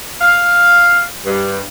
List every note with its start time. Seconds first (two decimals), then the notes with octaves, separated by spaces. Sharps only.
0.21 F5
1.26 G2